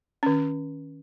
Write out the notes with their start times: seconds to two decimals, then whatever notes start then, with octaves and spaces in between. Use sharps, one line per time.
0.23 D#3 C#4